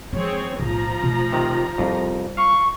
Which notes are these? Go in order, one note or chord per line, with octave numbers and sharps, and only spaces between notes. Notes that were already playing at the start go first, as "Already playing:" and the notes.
F3 G#3 C4 G#4 C#5
B1 A2 F3 A#5
B2 A3
C3 D#3
C2 F2 G3 F4
F5 C#6